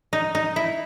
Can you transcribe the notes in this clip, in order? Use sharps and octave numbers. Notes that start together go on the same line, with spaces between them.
D#4
D#4
E4